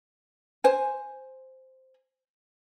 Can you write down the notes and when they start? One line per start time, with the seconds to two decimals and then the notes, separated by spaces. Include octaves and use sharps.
0.64 C5 G#5